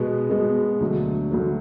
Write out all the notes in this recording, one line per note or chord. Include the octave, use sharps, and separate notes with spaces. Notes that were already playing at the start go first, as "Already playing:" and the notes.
Already playing: B2 G#3 B3
B2 G#3 B3
D2 D3 F#3
D2 D3 F#3